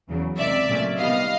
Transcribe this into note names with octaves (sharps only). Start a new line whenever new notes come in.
E2 C#3 F#3
C#2 C3 D#3 D5 E5
A#2 F#3 A3 C#4
C3 D#3 G3 B3 D#5 F5